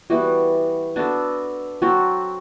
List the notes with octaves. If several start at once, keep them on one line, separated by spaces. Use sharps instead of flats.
E3 G3 B3 F#4
B3 D4 F#4 A4
F#3 C4 F#4 A4